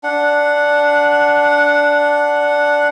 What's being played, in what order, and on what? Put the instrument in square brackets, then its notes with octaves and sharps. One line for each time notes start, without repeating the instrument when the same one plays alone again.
[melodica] D4 F#5